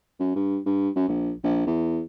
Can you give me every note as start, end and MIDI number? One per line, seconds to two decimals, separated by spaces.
0.20 0.33 42
0.36 0.58 43
0.66 0.89 43
0.96 1.07 42
1.09 1.31 34
1.43 1.64 34
1.67 2.01 40